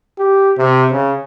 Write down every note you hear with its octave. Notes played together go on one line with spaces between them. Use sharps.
G4
C3
C#3